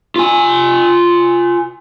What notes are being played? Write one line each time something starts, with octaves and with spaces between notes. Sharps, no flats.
F4 G#5